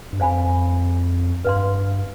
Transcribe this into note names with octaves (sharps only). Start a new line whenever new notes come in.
G2
F2 C5 F5 G#5 B5
G2 B4 F5 C6